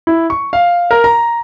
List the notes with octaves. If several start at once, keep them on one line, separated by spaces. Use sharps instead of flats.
E4
C#6
F5
A#4
A#5